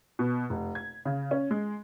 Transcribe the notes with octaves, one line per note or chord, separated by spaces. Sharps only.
B2
F1
G#6
C#3
C#4
G#3